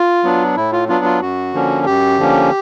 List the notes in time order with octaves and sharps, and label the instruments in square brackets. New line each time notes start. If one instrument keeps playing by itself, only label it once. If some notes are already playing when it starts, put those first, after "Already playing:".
Already playing: [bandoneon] F4
F#3 B3 D4
A2 E4
F4
F#3 B3 D4 F4
F4
F#2 F#4
D3 F3 A#3 C#4
F#2 G4
D3 F3 A#3 C#4